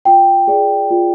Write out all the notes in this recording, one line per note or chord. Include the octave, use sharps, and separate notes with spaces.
F4 G5
G#4 D5
F4